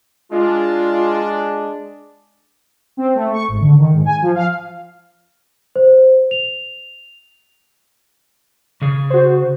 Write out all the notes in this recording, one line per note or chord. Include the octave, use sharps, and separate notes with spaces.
G#3 D4 F4
C4
A3
C#6
G#1
D3
D#3
G#2
G#5
F3
F5
C5
F7
C#3 G#4
F#4 C5